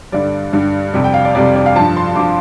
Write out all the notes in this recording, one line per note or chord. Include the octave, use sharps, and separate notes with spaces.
G2 D3 G3 D5
G2 D3 G3
F2 C3 G3
G5
F5
D5
F2 C3 G3 D5
D5
F5
G2 F3 A5
C6
G2 F3 D6